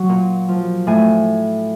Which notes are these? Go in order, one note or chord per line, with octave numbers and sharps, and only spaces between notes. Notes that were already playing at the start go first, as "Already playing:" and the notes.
Already playing: F#3
A#2
F3
A2 G#5